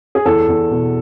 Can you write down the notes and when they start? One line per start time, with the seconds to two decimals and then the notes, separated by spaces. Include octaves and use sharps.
0.15 G#4
0.26 E2 A4
0.48 E2
0.71 B2